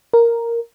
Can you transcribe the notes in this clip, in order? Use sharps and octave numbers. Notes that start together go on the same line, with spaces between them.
A#4